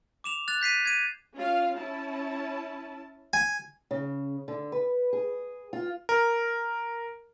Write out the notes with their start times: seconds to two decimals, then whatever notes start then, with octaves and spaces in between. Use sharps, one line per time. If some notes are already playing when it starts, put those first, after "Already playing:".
0.24 D6 E7 F7
0.48 F#6 A6 F7
0.61 G6 B6 C7 D#7
0.85 G#6 D#7
1.37 C#4 F4 F5
1.79 C#4 E4 A5
3.33 G#5
3.91 C#3
4.48 D3
4.72 B4
5.13 G#4
5.73 F4
6.09 A#4